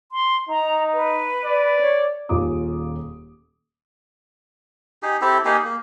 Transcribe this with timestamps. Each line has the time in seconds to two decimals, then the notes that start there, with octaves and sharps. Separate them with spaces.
0.12 C6
0.49 D#4 A#5
0.94 B4
1.45 D5
1.80 C#5
2.29 D#1 D#2 F4 G#4 D6 D#6
5.02 D#4 G4 G#4
5.21 C4 E4 G4 A4
5.45 A#3 D#4 G4 G#4
5.64 A#3